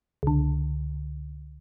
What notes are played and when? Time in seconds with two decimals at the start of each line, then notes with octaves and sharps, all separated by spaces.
0.23 C#2 D3